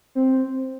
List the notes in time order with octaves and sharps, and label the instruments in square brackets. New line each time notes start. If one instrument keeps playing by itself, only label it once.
[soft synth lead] C4